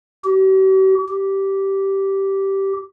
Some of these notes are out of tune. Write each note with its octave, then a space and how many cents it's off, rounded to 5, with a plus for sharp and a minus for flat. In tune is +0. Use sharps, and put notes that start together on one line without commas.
G4 -45
G4 -10